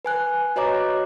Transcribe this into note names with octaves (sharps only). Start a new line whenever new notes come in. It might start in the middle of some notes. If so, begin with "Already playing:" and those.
B4 G#5 F#6
F#4 B4 C#5 D#5 A#5 D6